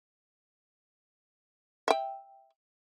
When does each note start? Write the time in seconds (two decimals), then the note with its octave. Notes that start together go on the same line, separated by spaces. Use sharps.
1.88 E5 G5